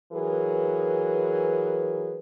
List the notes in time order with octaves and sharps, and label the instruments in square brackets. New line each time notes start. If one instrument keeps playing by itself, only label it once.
[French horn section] E3 F#3 G#4 A#4 B4